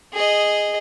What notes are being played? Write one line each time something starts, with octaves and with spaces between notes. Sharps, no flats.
G#4 D#5